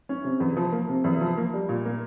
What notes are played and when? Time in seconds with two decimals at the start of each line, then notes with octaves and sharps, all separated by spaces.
0.09 C#4
0.24 C3
0.40 E2
0.57 F3
0.72 A#3
0.89 C3
1.04 E2
1.21 F3
1.37 A#3
1.53 G3
1.69 A#2
1.85 A#3